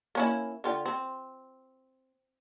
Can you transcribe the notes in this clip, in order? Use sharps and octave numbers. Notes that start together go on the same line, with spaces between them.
A#3 C#4 E4
D3 F4 G5
C4